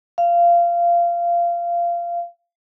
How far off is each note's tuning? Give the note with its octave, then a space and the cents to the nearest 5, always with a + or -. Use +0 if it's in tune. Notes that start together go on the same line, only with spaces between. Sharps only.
F5 -20